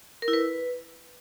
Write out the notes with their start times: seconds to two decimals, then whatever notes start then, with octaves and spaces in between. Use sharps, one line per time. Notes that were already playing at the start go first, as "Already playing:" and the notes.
0.22 A#4
0.28 E4
0.33 B4